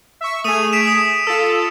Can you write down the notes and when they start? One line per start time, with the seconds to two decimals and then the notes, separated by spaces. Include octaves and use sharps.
0.21 E5 C#6
0.44 A3 G#4 D#6 D#7 F7
0.73 B6 D7 E7
0.87 D#6 E7
1.27 F4 A4 E6